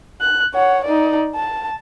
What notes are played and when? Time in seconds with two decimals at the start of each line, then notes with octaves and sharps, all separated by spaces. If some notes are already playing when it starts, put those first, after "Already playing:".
0.21 F#6
0.54 C#5 F#5
0.84 D#4 D5
1.35 A5